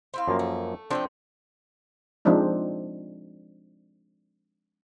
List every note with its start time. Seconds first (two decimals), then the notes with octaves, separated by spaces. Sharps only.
0.14 C4 E4 F5
0.28 F#2 F3 A#3
0.39 A3
0.91 F3 A3 C4 D4 G5
2.25 F3 G#3 C4 D4 D#4